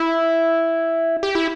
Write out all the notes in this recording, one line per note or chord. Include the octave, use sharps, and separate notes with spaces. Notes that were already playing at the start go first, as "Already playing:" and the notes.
Already playing: E4
G4
E4